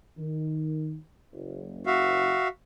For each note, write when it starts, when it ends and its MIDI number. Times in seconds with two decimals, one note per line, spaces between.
0.17 0.97 51
1.33 2.36 30
1.86 2.48 66
1.86 2.48 76
1.86 2.48 77